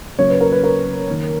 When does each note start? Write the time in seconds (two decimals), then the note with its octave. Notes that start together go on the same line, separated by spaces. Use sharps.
0.19 C#3 F#3 A#3 C#5
0.30 B4
0.41 A#4
0.52 B4
0.64 A#4
1.09 D#3 A#3